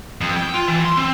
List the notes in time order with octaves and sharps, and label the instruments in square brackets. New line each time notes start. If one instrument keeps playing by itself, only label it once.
[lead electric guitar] F2
G5
F4
E3
C6
C4